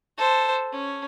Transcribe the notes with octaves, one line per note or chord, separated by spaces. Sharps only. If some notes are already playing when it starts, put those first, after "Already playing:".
A4 C5
C#4